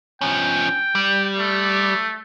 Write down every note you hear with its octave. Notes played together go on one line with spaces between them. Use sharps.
F3 C#4 G5
G3
A3